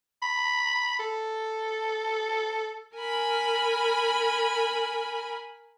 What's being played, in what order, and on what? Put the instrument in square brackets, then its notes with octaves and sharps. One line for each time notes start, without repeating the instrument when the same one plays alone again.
[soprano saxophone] B5
A4
[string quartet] A#4 G#5 B5